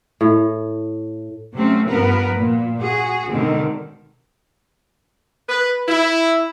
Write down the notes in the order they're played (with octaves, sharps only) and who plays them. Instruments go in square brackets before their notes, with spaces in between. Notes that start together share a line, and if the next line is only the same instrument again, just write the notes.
[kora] A2
[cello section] C3 F#3 A3 C4 C#4
G2 F3 B3 A#4 B4
A#2
F#4 G#4
B2 D3 D#3 G#3 C4
[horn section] B4
E4